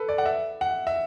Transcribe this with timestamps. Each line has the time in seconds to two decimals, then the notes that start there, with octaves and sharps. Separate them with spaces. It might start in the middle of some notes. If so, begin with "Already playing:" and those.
Already playing: A4 B4
0.09 D5
0.18 F#5
0.26 E5
0.61 F#5
0.87 E5